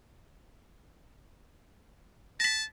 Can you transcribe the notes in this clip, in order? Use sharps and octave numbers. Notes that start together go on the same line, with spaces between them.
A5 A#6 B6